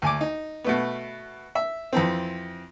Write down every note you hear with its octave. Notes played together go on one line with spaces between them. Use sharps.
D2 G#5 D6
D#4
B2 A3 B3
E5
F2 E3 C4